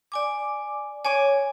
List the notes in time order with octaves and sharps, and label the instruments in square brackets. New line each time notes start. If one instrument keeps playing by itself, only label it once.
[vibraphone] D5 G#5 D6
[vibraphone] C#5 [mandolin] G#5 D6